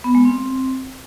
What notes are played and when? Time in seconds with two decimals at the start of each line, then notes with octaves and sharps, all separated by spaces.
0.04 B3
0.15 G#3
0.25 C4